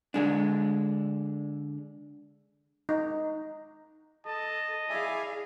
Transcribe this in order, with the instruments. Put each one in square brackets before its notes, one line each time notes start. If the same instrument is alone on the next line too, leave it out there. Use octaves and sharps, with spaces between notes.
[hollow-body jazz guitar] D3 G#3 D4
[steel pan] D#4
[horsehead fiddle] A4 [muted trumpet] D#5 [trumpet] A5
[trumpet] E4 [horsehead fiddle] G#4 F5 [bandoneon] D5 E5 G#5